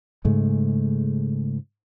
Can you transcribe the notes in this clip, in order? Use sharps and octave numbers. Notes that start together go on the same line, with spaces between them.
G#2 C#3 G#3 A3